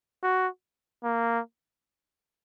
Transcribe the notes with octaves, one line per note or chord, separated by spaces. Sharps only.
F#4
A#3